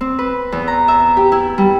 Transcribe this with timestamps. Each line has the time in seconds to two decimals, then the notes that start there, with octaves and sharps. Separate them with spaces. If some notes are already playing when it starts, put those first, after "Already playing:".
0.01 C4
0.19 B4
0.52 E2
0.68 A#5
0.88 E5
1.17 G4
1.32 E4
1.58 G3